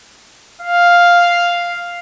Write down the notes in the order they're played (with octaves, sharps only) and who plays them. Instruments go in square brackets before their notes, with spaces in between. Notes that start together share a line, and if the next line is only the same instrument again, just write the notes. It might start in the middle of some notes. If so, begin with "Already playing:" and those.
[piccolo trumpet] F5